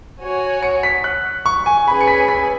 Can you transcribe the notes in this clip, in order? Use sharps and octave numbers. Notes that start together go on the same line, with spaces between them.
F#4 C#5 G#5
C#7
B6
F#6
C#6
G#5
C#4 G#4 B4 G#5 B5
C#7
B6
B6